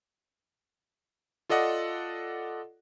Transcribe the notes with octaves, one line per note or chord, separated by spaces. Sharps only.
F4 A4 D5 D#5 F#5